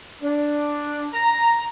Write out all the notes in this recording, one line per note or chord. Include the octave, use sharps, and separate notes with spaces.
D4
A#5